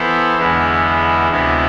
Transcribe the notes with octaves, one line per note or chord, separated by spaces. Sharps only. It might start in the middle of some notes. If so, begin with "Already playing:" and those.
Already playing: E3 B3 E4 A4 C5
E2 D3 G#3 B3 E4
D2 C3 G#3 B3 E4